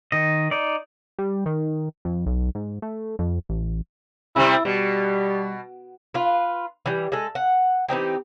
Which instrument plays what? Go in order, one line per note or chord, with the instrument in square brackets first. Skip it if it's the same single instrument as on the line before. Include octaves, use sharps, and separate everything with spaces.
[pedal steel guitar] D#3 D#5
D#4 D5
[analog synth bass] G3
D#3
F2
B1
G#2
A3
F2
A1
[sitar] C3 G3 C4 [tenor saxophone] E4
[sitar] B2 [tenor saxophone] G3
[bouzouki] F4 B4
E3 G3
G#3 A4
F#5
E3 C4 D#4 G4